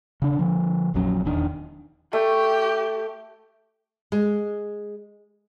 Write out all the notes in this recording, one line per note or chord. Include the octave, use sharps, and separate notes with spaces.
C#3 D4
D3 F3
A#1 F2 F#3 C#4
D#1 E2 D#3 D4
A3 G4
G#3